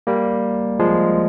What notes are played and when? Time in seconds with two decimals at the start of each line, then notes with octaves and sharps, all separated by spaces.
0.07 G3 A#3
0.79 F3 G#3